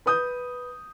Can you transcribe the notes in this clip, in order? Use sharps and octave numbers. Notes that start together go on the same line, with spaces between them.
B4 D#6 G6